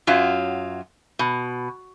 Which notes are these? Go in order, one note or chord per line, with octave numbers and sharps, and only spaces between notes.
F#2 F#3 F4
B2